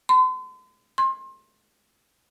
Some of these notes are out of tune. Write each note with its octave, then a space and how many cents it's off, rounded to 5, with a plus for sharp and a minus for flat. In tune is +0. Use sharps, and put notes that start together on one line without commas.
C6 -40
C6 +30